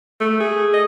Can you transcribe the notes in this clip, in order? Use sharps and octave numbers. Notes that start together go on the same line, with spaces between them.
A3
G#4
D#5